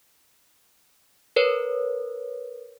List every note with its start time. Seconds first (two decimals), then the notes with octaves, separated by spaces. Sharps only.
1.36 A#4 B4 C#5